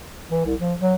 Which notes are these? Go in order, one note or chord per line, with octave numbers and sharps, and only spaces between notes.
E3
C2
F3
F#3